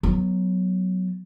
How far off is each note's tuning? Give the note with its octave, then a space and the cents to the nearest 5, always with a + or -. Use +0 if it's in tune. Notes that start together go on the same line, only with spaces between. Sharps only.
F#3 +0 B3 +0